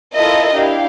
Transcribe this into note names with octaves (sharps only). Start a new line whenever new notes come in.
E4 F4 A4 A#4 D#5 E5
D4 E4 G4 F5